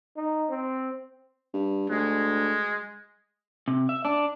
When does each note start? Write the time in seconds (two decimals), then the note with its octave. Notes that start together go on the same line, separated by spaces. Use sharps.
0.17 D#4
0.49 C4
1.54 G2
1.90 D2 G#3
3.68 C3
3.89 E5
4.05 D4